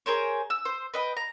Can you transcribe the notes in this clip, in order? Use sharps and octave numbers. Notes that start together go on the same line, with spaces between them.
G#4 A#4 C5 C#5
E6
C5
B4 D#5 G5
A#5